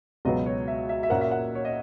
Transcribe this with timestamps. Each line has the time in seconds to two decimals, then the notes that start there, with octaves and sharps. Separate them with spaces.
0.25 C#2 B2 F#3 B3 D#5
0.46 C#5
0.68 E5
0.89 E5
1.03 E5
1.10 A#2 A#3 C#4 F#4 A#4 F#5
1.21 E5
1.31 F#5
1.55 C#5
1.65 D#5